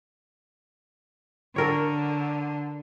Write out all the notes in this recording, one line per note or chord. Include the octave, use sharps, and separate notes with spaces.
D3 A4 A#4 C#5